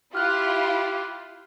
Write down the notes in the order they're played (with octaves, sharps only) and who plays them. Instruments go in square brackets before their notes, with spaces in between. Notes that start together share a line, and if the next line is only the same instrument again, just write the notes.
[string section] E4 F4 [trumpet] G4 [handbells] F6 F#6